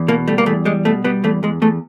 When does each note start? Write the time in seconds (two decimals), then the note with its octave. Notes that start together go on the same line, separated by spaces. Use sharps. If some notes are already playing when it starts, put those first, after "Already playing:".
Already playing: E2
0.08 B2 A#3
0.28 G3 A3
0.38 A#3
0.46 E2 A3
0.65 G3 G#3
0.85 B2 A3
1.04 G3 B3
1.24 E2 A3
1.43 E2 G#3
1.62 E2 A3